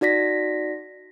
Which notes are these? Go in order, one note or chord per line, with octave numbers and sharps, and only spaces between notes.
D#4 F#4 D5 A#6 B6